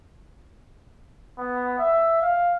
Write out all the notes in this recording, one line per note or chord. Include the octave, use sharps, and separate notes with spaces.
B3
E5
F5